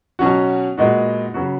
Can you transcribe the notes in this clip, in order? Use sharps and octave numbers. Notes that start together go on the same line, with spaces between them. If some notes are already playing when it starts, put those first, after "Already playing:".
B2 F#3 C#4 F#4
A#2 G#3 B3 D#4 F#4
C#3 F#3 B3 F#4